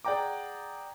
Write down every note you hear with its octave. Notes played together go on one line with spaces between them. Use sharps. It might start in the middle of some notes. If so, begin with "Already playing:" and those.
G#4 D5 F#5 G5 A#5 D6